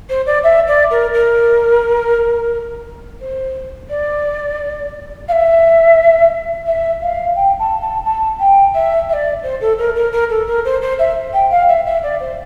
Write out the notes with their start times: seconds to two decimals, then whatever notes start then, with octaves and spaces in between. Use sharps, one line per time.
0.09 C5
0.26 D5
0.44 E5
0.67 D5
0.91 A#4
1.14 A#4
3.21 C5
3.90 D5
5.28 F5
5.32 E5
6.67 E5
7.02 F5
7.36 G5
7.59 A5
7.82 A5
8.05 A5
8.40 G5
8.74 E5
9.09 E5
9.13 D5
9.43 C5
9.61 A4
9.78 A#4
9.96 A#4
10.12 A#4
10.30 A4
10.47 A#4
10.65 C5
10.82 C5
10.99 E5
11.33 G5
11.50 F5
11.68 E5
11.86 E5
12.03 D5
12.20 C5